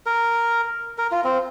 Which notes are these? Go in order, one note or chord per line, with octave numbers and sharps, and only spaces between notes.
A#4
A#4
F4
C4